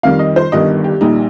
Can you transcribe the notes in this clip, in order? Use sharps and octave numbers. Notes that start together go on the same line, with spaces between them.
F2 D#3 G3 F5
D#5
C5
G1 G2 D#3 D#5
G4
A#1 A#2 G3 D#4